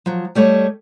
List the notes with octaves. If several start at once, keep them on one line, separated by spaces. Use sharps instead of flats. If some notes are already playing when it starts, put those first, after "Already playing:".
F3 F#3
G3 A3 C#5 D#5